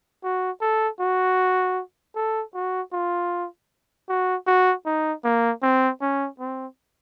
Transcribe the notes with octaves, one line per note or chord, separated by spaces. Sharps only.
F#4
A4
F#4
A4
F#4
F4
F#4
F#4
D#4
A#3
C4
C#4
C4